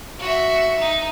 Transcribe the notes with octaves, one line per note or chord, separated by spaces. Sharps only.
F#4 E5
D#4